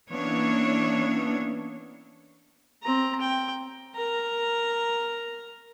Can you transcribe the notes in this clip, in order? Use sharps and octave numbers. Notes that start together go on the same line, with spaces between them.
E3 A#3 B3 C#4 D4 C#5
C4 A#5
G5
A#4 A#5